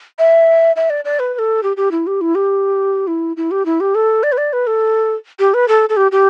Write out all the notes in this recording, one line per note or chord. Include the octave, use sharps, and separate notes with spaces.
E5
E5
D5
D5
B4
B4
A4
G4
G4
E4
G4
E4
G4
E4
E4
G4
E4
G4
A4
D5
B4
D5
B4
A4
G4
B4
A4
A4
G4
G4